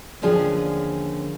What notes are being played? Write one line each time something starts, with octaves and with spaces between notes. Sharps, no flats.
D#2 D3 F3 C#4 G#4